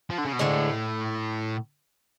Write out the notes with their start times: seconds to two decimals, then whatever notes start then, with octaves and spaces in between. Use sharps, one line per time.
0.10 F3
0.18 D3
0.25 C#3
0.33 B2
0.39 D2 A2 D3 G#3